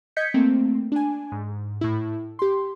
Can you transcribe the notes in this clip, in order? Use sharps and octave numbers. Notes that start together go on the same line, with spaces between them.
D#5 G6 G#6 B6 C#7
A3 A#3 C4
D4 G#5
G#2
A2 E4
G4 C6